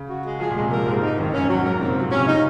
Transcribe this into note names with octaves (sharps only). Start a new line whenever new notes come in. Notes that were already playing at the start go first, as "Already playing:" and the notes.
Already playing: C#3
F#4
G#3
F3 G#4
A#2
C3 G#3
A#2 A#4
G#2 C4
G#2 D#4
F#2 D#3
G#2 C#4
F#2
F#3
G#2 A#4
A#2
C3 C4
A#2 F#3
C3 C#4
C#3 D#4